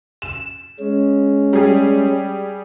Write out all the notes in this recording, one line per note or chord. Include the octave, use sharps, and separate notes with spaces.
E7
G#3 C#4
G3 G#4